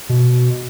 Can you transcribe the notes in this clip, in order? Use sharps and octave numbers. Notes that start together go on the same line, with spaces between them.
B2